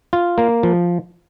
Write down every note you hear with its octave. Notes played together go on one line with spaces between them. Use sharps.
F4
A#3
F3